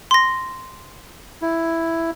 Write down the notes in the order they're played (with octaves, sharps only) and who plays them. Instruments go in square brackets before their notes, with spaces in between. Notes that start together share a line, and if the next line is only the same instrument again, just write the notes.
[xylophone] C6 A#6
[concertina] E4